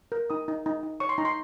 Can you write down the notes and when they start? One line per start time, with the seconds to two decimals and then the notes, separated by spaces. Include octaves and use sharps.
0.12 A#4
0.30 D#4 D#6
0.48 D#4
0.66 D#4
0.83 D#4
1.00 C#5 C#6
1.09 C6
1.18 D#4 A#5
1.25 C6